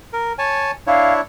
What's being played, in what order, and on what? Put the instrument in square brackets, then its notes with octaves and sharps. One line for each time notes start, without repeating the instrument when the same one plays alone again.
[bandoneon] A#4
C#5 G#5 A5
[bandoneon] D4 E4 C#5 [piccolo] F5